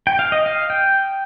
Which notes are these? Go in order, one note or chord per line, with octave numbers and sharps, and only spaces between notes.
G5
F5
D#5
F5
G5